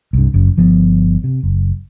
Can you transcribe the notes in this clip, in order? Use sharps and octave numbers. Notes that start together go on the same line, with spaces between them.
C2 G2
F#1 F#2
G1 F3 B3
C3
F#1